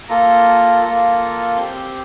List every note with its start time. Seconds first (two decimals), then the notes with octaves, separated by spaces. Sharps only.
0.09 A#3 F4 A4 A#5
0.83 A#3 F4 A4
1.57 C4 G4 C6